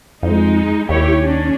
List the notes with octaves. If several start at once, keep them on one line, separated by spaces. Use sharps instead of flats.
F2 G#3 D#4
D#2 E4 G4 C#5
C#4 D4